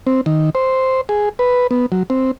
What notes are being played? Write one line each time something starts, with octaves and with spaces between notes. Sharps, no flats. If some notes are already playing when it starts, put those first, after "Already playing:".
C4
D#3
C5
G#4
B4
B3
F#3
C4